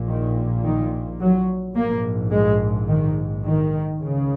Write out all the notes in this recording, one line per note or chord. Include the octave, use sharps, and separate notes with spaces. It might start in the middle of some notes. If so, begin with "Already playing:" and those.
Already playing: A#1 A#2
D#3
D#3
F#3
A#1 G#2 A#3
G#3
D#3
D#3
C#2 C#3